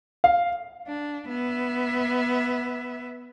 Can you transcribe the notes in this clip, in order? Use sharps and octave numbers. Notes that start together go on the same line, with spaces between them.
F5
D4
B3 E5